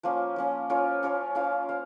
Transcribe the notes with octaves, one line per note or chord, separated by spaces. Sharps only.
F3 A#3 C#4
F3 A#3 C#4
C#4 F4 A#4 C#5
C#4 F4 A#4 C#5
C#4 F4 C5 F5
C5 F5